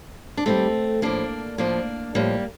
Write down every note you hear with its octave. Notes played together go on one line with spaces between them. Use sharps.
D4
D#2 D#3 G3 A3 C4
A2 F3 A#3 D4
A2 F3 A#3 D4
A2 F3 G3 A#3